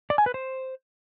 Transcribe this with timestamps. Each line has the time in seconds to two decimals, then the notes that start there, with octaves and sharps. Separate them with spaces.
0.10 D5
0.18 G#5
0.26 B4
0.34 C5